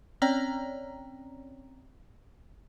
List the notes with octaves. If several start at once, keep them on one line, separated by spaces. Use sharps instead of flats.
C4 C#4 C#5 D5 G5 A#5